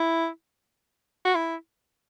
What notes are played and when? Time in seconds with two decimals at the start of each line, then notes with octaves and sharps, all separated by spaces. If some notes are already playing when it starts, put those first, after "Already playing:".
Already playing: E4
1.25 F#4
1.35 E4